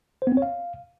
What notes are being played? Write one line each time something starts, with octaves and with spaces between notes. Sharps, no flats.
C5
B3
C4
C#5
F5